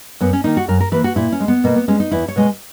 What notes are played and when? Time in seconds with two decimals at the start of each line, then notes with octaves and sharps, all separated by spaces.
0.21 F#2 B3
0.33 C#4
0.44 D#3 A#3 D#4
0.57 F#4
0.68 F#2 A#4
0.80 A#4
0.92 E3 A#3 B4
1.04 F#4
1.16 A#2 E4
1.32 C#4
1.40 G#3
1.48 B3
1.64 B2 A#3
1.76 B3
1.88 G#3 C#4
2.00 D#4
2.11 E2 E4
2.28 C#5
2.36 B2 G#3